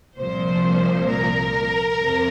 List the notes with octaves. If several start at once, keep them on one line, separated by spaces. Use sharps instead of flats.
C2 A#2 F3 C5
A#4
F2 C3